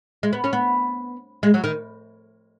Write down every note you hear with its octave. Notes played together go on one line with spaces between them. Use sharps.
G#3
B3
C#4
B3
G#3
F#3
D#3